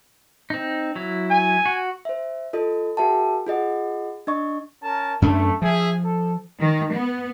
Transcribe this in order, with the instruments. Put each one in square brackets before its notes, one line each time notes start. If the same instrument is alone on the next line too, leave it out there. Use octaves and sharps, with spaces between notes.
[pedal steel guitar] C4 D#4
F#3 E4
[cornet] G#5
[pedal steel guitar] F#4
[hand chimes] C5 E5
F4 A4 D#5
F#4 G#4 A#4 E5 G5 A5
F4 G#4 D#5 F#5
D4 D#5 C#6
[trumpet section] C#4 A#4 A5
[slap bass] F#2 C#4 D4 [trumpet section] A3
[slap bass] F3 [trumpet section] G#4 E5
[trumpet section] A4
[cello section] D#3
B3